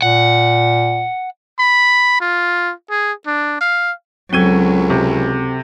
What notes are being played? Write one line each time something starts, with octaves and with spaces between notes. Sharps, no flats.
A#2 F#5
B5
F4
G#4
D4
F5
C#2 F#3 C4 F#4 A4 G#6 D#7 G7
C3